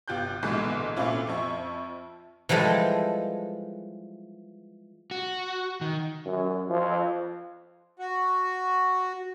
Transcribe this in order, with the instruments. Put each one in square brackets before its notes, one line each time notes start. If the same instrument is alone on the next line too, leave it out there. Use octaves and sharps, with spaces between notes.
[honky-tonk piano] G1 F4 G4 F#6 G6
A#1 G#2 B2 D3 E3 G#3
A#2 A3 C4 C#4 E4 F4
F2 F3 E5 C#6
[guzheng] E3 F3 G3 G#3 A4
[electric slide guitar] F#4
D#3
[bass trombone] F#2
F3
[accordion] F#4